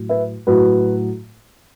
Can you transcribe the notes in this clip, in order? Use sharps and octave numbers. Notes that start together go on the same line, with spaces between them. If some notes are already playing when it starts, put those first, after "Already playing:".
Already playing: A2 F#3
B4 E5
A2 F#3 F#4 B4